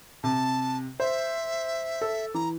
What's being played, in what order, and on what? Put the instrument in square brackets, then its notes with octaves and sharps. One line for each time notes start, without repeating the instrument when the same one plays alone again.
[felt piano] C3 [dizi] A5
[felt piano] C5 [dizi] E5
[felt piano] A4
[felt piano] E3 [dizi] A#5